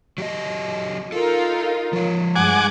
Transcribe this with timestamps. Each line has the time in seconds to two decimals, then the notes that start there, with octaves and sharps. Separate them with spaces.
0.18 F#3 G4 D#5
1.12 D#4 F4 A4 A#4
1.93 F3 C#5
2.36 G2 G#3 F#5 G#5 D6